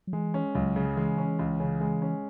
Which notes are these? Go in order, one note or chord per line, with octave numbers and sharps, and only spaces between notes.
F#3
E3 G#3
C#4
C#2 F#3
C#3
E3 G#3
C#4
C#2
C#3
G#3
C#4